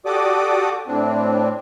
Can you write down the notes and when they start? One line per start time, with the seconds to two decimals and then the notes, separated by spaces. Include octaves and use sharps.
0.06 F#4 G4 A4 D5 D6 D#6
0.87 A2 C4 D4